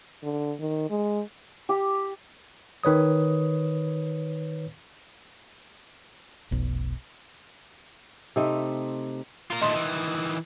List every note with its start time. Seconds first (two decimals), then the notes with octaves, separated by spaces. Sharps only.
0.23 D3
0.60 D#3
0.90 G#3
1.69 G4
2.84 D#3 B4 C#5 D#6
6.51 F1 B1
8.36 C3 A3 C4 D#4
9.50 F4 A#4
9.61 A#2 D#3 A3 D#5 C6
9.74 D#3 E3